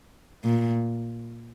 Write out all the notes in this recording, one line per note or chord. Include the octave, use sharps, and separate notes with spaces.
A#2